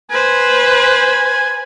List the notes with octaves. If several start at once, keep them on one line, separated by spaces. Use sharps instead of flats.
B4 C5 G#5